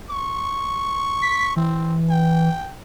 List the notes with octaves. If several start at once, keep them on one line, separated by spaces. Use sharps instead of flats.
C#6
B6
E3 C4
G5